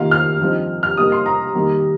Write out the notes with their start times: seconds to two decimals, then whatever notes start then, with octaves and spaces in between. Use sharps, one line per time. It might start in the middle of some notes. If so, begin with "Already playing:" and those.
Already playing: C3 D#3 A#3 F4 F5
0.11 F6
0.39 G2 F3 C4 D#4
0.83 F6
0.97 C3 G3 A#3 D#4 D#6
1.12 C6
1.26 A#5
1.55 D#3 G3 A#3